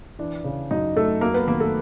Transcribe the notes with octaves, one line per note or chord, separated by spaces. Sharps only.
E3 D4
C#3
F#2 D#4
F#2 A3 A4
F#3 A#3 A#4
B3 B4
D#3 A#3 A#4
A3 A4